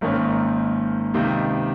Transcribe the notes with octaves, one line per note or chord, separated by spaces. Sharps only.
G#1 G#2 D#3 A#3 C#4
C#2 C3 D#3